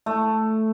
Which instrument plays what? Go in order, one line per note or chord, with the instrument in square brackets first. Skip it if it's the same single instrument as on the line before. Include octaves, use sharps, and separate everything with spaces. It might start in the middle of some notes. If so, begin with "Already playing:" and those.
[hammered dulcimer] A3